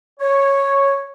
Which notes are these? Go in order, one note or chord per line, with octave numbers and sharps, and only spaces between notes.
C#5